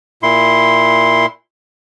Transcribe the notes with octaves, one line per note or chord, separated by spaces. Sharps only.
A#2 E4 C6